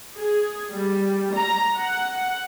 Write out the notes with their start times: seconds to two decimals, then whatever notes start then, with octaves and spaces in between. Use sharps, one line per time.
0.17 G#4
0.71 G3
1.34 A#5
1.77 F#5